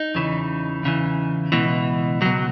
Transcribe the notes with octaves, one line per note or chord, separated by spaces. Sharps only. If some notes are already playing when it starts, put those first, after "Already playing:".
Already playing: D#4
E2 C#3 E3
E2 C#3 E3
C#2 B2 E3
C#2 B2 F#3